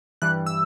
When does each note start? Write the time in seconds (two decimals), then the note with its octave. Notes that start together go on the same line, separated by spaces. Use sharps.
0.22 G2 E3 G3 F#6
0.46 E6